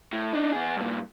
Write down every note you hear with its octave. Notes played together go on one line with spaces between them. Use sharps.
A2
D4 D#4
B3 G#4
G2 A#2